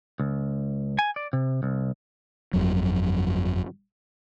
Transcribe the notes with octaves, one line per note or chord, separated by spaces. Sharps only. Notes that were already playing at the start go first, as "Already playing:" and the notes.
C#2
G#5
D5
C3
C2
G1 F2 F#3